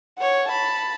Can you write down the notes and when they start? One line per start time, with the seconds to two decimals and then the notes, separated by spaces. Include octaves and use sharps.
0.18 C#5 F#5
0.48 A5 B5